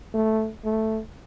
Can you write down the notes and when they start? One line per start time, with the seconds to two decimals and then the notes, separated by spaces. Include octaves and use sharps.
0.14 A3
0.65 A3